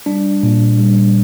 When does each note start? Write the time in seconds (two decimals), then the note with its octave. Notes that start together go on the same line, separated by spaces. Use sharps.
0.06 G3 D4
0.43 A#2
0.79 G3